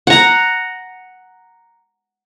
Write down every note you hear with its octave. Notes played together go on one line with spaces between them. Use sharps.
F#5 A#5